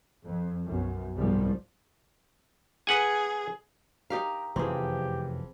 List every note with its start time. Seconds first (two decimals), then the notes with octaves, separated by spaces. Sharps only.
0.24 F2
0.66 B1 F#2
1.16 C2 G#2 B2 F3 G3
2.87 G#4 B4 F#5 G#5
4.10 D#4 G4 A#4 F5 A#5
4.56 F1 F#2 E3 F3 C4 G4 G#4